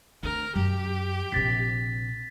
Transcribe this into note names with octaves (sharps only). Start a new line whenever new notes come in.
D2 C4 A#4
F#2 G4
A#1 C3 A6 B6